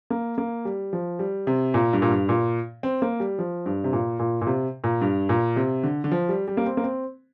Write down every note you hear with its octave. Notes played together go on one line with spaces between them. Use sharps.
A#3
A#3
G3
F3
G3
C3
A#2
G2
A#2
G2
A#2
C4
A#3
G3
F3
G2
C3
A#2
A#2
A#2
C3
A#2
G2
A#2
C3
D3
D3
F3
G3
G3
A#3
C4
A#3
C4